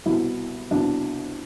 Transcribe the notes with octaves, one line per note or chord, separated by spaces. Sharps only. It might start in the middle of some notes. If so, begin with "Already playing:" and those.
C2 B2 E4
C2 B2 D4